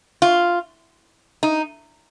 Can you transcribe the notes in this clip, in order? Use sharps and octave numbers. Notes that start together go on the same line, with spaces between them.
F4
D#4